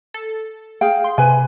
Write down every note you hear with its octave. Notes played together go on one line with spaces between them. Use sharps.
A4
G#4 F5 G5
C6
C3 B4 G#5